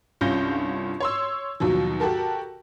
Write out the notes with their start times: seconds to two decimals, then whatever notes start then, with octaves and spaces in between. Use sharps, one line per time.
0.21 C2 G2 C#4 F4 G6 A#6
1.00 C#5 C6 E6
1.60 D#2 B2 F3 F#3
2.00 F#4 G4 A4 A#4